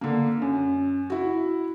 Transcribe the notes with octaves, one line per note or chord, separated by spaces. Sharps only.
D3 A#3
F#2
E4 F#4